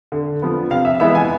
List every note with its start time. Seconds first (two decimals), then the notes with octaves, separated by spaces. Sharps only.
0.12 D3
0.42 F3 B3
0.70 C3 F5
0.85 E5
1.00 E3 G#3 B3 E5
1.15 G#5